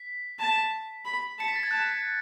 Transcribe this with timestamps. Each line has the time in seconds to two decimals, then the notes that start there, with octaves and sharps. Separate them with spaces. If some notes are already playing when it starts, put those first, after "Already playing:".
Already playing: B6
0.39 A5
1.05 B5
1.38 A5 C#7
1.48 B6
1.56 A6
1.63 G#6
1.71 A5 F#6